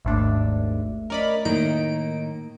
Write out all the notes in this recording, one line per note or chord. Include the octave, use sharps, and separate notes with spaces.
G#1 D#2 A3 D4 E5
C#4 A#4 D5 D#5 B5
A2 D#3 A#3 D#4 D7